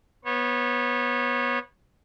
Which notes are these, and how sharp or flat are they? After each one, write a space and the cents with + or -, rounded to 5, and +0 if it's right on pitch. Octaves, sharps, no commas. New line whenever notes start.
B3 -15 C#5 -30